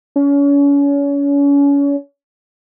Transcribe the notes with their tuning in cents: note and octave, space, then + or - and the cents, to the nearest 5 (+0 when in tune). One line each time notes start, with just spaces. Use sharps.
C#4 +35